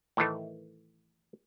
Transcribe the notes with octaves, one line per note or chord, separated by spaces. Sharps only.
A2 D#3 E3 A3